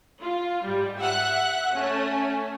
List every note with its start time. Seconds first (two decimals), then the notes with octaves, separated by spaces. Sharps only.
0.21 F4
0.64 G#2 G3
0.99 E5 F#5 F#6
1.74 A3 C#4